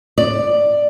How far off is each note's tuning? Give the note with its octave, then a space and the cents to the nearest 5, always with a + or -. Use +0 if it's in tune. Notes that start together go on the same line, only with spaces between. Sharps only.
D5 +10